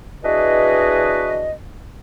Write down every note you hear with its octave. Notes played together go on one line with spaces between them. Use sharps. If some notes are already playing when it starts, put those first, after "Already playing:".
E3 D4 F#4 G#4 B4 D#5